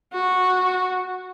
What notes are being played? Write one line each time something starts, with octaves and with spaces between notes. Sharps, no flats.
F#4